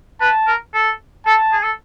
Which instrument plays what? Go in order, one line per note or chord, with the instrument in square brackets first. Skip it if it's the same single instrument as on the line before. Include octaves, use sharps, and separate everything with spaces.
[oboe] B4 [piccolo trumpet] A5
[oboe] A#4
A4
[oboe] A4 [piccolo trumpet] A5
[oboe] G#4
A4